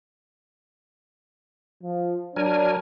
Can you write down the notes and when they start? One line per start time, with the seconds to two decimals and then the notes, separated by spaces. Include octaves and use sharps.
1.82 F3
2.36 F#3 D4 A#4 G#5